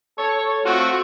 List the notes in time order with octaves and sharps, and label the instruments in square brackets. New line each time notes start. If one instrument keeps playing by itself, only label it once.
[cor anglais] A4 [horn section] C#5
[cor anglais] A3 [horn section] C4 F4 F#4